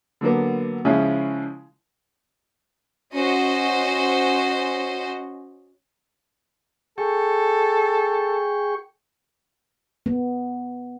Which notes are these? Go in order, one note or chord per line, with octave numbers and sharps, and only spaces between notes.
D3 F#3 A#3 B3
C#3 F3 G#3 C#4 E4
C#4 F#4 C5 D#5
G#4 A4 G5 C#6
B3